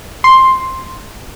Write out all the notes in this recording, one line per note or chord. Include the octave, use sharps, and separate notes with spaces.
C6